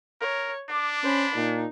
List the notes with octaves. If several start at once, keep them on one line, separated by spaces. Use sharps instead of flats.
A#4 C#5
D4 D6
C#4 C5 B5
A#2 D#4